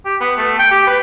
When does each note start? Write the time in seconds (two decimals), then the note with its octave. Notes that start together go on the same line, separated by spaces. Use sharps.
0.05 G4
0.21 B3
0.38 A3
0.59 G5
0.72 G4
0.87 B4